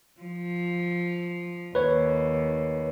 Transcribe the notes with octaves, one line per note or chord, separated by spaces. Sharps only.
F3
D#2 B4 C#5